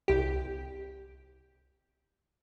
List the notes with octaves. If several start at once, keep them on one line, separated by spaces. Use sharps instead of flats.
C2 G4